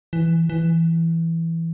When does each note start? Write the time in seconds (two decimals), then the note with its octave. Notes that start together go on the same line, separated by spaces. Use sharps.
0.13 E3
0.49 E3